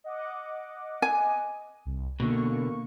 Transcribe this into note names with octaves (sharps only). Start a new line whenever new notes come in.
D#5 F#5 D6
G#5
C2
B2 D3 A#3 C#6